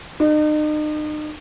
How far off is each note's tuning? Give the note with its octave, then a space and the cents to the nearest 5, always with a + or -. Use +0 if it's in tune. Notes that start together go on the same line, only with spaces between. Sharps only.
D#4 -40